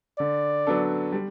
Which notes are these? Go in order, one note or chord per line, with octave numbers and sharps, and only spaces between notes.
D3 D5
F#3 B3 D4 A4
G3